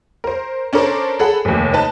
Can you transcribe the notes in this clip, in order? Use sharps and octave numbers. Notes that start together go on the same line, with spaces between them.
A#4 C5
C#4 D4 A4 A#4 C5
G#4 A4 F#5 B5
F1 D#2
D#4 B4 A5